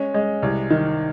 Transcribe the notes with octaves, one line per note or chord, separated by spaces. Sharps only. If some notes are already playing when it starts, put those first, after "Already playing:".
Already playing: G#3 C#4
G#3
C2
D#3